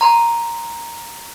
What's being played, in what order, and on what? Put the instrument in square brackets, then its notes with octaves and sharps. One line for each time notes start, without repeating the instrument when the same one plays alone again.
[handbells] A#5 C6